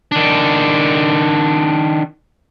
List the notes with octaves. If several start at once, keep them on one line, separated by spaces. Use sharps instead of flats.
D#3 D4